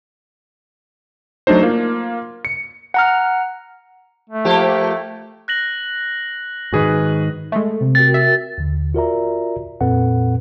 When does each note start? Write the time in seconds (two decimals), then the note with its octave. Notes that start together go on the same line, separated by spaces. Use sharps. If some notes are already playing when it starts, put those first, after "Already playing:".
1.47 F#3 A3 D4 D#4 C5
1.63 A#3 F4
2.45 C#7
2.94 F#5 A#5 F6
4.30 A3
4.45 F3 A#3 G4
5.48 F#6 A#6 F#7
6.72 G#2 D#3 F#4 G#4 B4
7.52 G#3 A3 A4
7.80 C3
7.95 F#4 A#4 G5 A6
8.14 E5
8.58 D#2 D3
8.94 F4 F#4 A#4 D5 E5 A#5
9.81 F2 A#2 C4 A4 B4 F#5